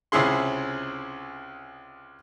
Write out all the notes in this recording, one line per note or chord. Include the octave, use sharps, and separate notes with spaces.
C#2 C3 C#4 E4 G#4 C6